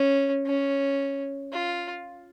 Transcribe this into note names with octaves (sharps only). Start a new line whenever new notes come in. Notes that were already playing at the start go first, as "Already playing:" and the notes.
Already playing: C#4
C#4
F4